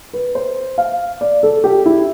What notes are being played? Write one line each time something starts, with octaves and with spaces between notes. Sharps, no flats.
B4
C5
F5
D5
A4
G4
E4